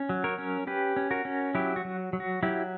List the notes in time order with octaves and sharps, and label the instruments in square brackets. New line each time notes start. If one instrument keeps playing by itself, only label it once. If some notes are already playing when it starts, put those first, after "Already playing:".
Already playing: [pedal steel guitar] C#4
F#3
A#4 C#5
C#4
C#4 G4 B4
C#4
F#4 A#4
C#4
F#3 E4 G4
F#4
F#3
F#3
F#4
F#3 E4 G4